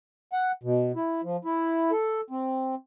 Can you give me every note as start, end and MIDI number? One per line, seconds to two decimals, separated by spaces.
0.32 0.52 78
0.63 0.92 47
0.96 1.21 64
1.24 1.37 53
1.45 1.91 64
1.91 2.21 69
2.30 2.75 60